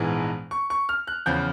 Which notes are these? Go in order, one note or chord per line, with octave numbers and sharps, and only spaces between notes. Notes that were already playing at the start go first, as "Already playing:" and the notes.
Already playing: A#1 G#2 E3 G#3 B3
C#6
C#6
F6
F#6
E2 C#3 F3 G6